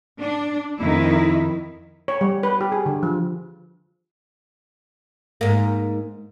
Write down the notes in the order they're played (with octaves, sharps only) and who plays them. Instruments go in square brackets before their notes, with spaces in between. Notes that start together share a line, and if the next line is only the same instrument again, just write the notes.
[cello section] D4
F2 D#3 E4
[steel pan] C#5
G3
B4
G4
G#4
D3
F3
[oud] G#2 A#3